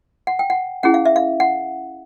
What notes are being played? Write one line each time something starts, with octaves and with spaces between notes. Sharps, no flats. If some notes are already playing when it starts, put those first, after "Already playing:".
F#5
G5
F#5
C#4 E4 G#4 F#5
F5
E5
F5
F#5